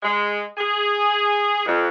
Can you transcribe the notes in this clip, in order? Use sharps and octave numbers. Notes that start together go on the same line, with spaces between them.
G#3
G#4
F2